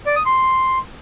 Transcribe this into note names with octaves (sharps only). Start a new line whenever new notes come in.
D5
D#6
C6